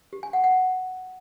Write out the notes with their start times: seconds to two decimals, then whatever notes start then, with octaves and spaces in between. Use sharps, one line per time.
0.13 G4
0.23 G#5
0.33 F#5
0.44 F#5